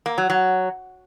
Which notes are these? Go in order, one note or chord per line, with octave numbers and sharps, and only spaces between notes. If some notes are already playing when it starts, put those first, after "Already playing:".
A#3
F#3
F#3